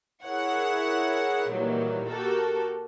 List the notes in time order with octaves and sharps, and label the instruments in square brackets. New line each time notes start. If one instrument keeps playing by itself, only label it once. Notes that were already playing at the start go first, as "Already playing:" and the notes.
[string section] E4 G#4 A#4 C#5 F#5
A#2 D#3 E3 F#3 G3
F#4 G4 A4 A#4